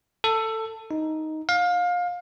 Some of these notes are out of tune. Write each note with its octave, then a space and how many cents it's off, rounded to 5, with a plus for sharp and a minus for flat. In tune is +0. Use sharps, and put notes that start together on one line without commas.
A4 +15
D#4 +5
F5 +25